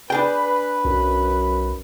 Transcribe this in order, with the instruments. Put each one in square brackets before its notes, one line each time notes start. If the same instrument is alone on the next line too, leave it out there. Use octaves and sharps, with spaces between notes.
[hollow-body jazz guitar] D4 G#4 G5 [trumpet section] B4
[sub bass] B1 [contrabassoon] F#2